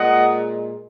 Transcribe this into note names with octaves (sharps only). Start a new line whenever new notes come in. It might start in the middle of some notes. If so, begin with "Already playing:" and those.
Already playing: A#2 G#3 D#5 F#5